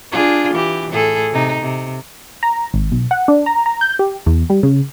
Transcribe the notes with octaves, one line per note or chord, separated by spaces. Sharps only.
D4 F4 G#4
E3 G4
A2 G#4 A4
C3 D#4
C3
A#5
G#1
B1
F#5
D4
A#5
A#5
G6
G4
E2
G3
C#3